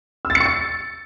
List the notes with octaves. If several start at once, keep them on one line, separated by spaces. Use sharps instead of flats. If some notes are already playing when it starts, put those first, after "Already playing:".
E6
A6
C#7
C#6
A6